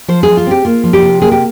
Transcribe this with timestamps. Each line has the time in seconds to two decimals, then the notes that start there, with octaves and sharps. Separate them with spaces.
0.08 F3 C5
0.23 F3 G#4
0.37 F4
0.47 C4 G4
0.65 A#3 F4
0.84 F3
0.93 G4
1.02 C3
1.22 A#3 G#4
1.32 G4